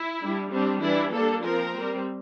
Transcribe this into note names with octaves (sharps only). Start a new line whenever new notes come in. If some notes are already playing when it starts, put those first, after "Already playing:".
Already playing: E4
G3 D4
G3 C4 D4
E3 G3 D4 E4
G3 A#3 D4 A4
F3 C4 A#4
C4
G3